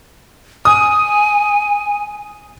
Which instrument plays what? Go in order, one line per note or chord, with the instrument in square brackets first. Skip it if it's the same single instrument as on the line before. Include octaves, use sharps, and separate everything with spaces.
[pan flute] G#5 [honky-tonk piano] D#6